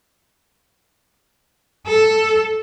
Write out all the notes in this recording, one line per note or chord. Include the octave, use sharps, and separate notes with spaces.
A4